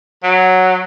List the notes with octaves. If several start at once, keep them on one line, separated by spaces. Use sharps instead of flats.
F#3